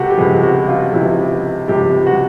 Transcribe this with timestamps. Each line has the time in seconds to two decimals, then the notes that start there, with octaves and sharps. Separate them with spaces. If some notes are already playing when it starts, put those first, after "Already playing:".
Already playing: C#2 C3 F#4 G4 A4
0.10 G4
0.18 C#2 C3 F3 G#4
0.43 F#4
0.68 F4
0.92 C#2 C3 F3 E4
1.68 C#2 C3 F3 G4
2.06 F#4